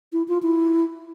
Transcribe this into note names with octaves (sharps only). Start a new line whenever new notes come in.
E4
F4
E4